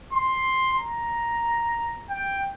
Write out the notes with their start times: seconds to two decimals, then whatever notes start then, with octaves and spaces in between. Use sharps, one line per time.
0.13 C6
0.79 A#5
2.10 G5